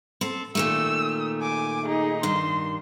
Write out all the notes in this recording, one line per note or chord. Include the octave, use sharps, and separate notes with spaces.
C4 A4
A#2 D#3 A3 E6
G#5 D6
D#4 G#4
G2 D#3 C6